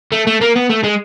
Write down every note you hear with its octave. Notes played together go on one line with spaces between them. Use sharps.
A3
A3
A#3
B3
A3
G#3